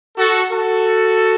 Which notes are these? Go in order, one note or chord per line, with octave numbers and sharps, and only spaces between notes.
F#4 A4
F#4 A4